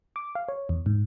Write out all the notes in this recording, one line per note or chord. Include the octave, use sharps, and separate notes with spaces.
D6
F5
C#5
E2
G#2